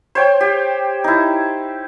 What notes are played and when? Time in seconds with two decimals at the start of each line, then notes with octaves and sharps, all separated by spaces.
0.15 C5 C#5 G5
0.41 G4
1.04 D#4 E4